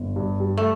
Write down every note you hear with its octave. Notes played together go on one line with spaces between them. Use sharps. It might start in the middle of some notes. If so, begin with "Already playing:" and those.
Already playing: G1
G2
G3
A3